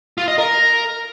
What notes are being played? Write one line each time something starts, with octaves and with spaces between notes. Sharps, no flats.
F4
D#5
A#4